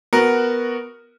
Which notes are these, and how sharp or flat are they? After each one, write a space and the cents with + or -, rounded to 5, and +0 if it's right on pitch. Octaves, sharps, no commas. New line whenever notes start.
B3 +0 F#4 +0 A#4 +0